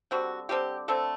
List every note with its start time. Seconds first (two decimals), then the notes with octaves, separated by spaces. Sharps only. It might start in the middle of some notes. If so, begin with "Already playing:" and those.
0.11 D3 G3 C4 F#4
0.49 D3 G3 C4 G4
0.88 D3 A3 C4 A4